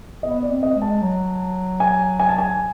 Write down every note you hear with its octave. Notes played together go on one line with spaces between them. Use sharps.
B3 D#5
D5
C4
D#5
G#3
A5
F#3
G#5
G#5
A5
G#5